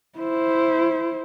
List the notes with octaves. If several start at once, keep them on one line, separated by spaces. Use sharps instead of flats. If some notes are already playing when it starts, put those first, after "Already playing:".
E4 C5